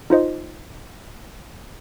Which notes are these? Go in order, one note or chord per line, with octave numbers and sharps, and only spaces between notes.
D#4 F4 C5 D#5